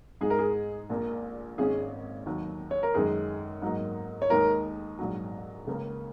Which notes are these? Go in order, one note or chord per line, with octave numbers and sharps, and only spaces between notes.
G#2 G#3 D#4 G#4
A#4
G#4
A#1 A#2 A#3
G#1 G#2 G#3 C#4 G#4
D#2 D#3 F#3
C#5
A#4
F#2 D#3 G#3 G#4
G#2 F#3 A#3 D#4
C#5
D#2 D#3 G#3 D#4 A#4
A#1 G#2 F#3
C#2 C#3 A#3